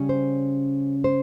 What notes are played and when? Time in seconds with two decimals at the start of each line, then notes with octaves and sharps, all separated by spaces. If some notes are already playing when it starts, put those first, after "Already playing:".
Already playing: C#3 G3 C#4
0.09 C5
1.04 C5